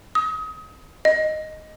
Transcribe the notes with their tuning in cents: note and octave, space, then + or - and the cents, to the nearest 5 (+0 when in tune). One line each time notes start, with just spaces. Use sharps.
D#6 +30
D#5 -5